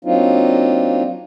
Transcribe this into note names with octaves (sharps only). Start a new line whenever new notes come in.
F#3 A#3 C4 D4 D#4 F4